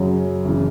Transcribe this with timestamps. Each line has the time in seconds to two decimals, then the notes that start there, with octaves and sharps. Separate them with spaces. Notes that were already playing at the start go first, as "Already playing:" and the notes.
Already playing: F#2 C#3 F#3
0.45 F#1 C#3 E3